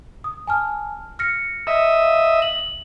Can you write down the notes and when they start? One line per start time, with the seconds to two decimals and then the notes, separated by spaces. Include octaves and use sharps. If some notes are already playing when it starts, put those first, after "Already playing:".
0.24 D#6
0.47 G#5 A5 F6
1.19 F6 A#6 C#7
1.67 D#5 E5
2.04 F5
2.42 F#7